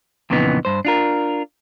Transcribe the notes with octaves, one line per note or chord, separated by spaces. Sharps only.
F2 A#2 C#3 E3 B3 D#4
G2 C5
D4 F4 A#4